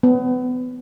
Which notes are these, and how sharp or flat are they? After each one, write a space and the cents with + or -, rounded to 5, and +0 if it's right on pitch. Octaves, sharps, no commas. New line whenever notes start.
B3 +30